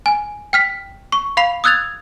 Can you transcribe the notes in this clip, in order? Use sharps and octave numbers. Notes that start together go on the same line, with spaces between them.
G#5
G5 F6 B6
C#6
F5 B5 C7 F7
D#6 E6 F#6 G#6 A6 F7